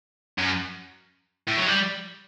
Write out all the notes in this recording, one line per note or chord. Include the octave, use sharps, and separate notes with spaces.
F#2
A2
F#3
G3